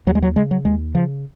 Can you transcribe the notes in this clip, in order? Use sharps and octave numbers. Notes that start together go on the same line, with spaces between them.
D#2 F#3
G#3
F#3
C#3 G#3
F#3
D#2 G#3
C#3 F3